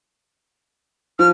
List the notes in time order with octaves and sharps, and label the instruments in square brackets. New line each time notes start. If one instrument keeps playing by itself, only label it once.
[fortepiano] F3 [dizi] F6